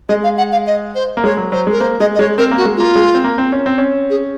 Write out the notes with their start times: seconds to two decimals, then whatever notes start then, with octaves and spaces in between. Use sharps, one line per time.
0.09 G#3 D#5
0.23 F5
0.37 F#5
0.52 F5
0.66 D#5
0.95 C5
1.17 A#3
1.24 G#3 C#5
1.37 F#3
1.52 F#3 C5
1.67 G#3 A#4
1.80 A#3 C5
2.00 G#3 D#5
2.14 D#5
2.19 G#3 C#5
2.38 C4 A#4
2.51 A#3
2.57 F#4
2.65 G#3
2.77 A#3 F4
2.96 G#3
3.14 C4
3.24 A#3
3.38 C4
3.52 C#4
3.66 C4
3.78 C#4
4.10 G#4